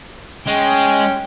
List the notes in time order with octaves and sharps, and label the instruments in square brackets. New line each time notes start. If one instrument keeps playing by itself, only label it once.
[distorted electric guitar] G#3 [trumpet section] C#4 [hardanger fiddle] G5